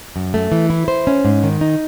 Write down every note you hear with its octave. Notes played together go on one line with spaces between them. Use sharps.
F#2
A3
E3
E4
C5
C#4
G#2
D#3
D#4